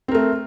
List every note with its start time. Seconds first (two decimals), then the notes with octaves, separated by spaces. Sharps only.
0.08 C4
0.11 A#4
0.15 A3